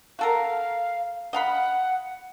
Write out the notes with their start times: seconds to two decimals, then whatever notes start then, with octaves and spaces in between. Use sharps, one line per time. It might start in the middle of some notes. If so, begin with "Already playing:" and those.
0.19 F#4 A4 A#4 F5
1.33 D#5 F5 F#5 B5